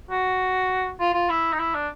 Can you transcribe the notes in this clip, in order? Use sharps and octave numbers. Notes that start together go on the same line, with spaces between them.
F#4
F4
F4
E4
D#4
E4
D4